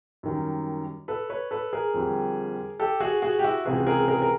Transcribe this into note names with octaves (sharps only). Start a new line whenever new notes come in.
F#2 D#3 G3
A4 B4
B4 C#5
A4 B4
G#4 A#4
F2 D3 G3
G4 A4
F#4 G#4
F#4 G#4
G4
E4 F#4
C#2 C3 E3 F#4 G#4
G#4 A#4
G#4 A#4
A#4